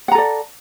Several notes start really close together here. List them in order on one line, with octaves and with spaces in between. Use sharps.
F#5 A#5 A4 D5